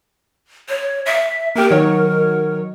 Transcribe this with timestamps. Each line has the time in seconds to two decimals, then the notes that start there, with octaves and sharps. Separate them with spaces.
0.68 C#5
1.06 E5
1.55 A#3 G4 A#4
1.70 D#3 F#3 C#5